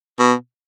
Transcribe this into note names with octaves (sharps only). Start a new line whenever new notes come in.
B2